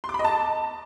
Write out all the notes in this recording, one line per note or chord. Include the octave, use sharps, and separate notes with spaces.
C6
D6
B5
D#5
A5